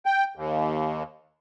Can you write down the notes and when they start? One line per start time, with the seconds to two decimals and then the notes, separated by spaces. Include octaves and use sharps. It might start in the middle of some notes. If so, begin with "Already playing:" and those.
0.06 G5
0.36 D#2